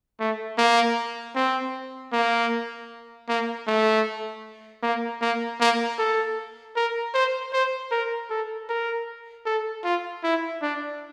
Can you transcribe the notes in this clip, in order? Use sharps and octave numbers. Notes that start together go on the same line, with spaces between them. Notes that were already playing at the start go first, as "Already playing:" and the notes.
A3
A#3
C4
A#3
A#3
A3
A#3
A#3
A#3
A4
A#4
C5
C5
A#4
A4
A#4
A4
F4
E4
D4